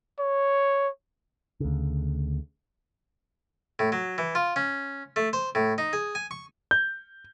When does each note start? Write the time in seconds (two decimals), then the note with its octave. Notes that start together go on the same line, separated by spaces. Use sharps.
0.19 C#5
1.60 D2 C#3
3.79 A2
3.92 F#3
4.18 E3
4.35 F4
4.56 C#4
5.16 A3
5.33 C5
5.55 A2
5.78 D#4
5.93 G#4
6.15 G#5
6.31 C#6
6.71 G6